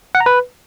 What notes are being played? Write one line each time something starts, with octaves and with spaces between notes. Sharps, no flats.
F#5
A#5
B4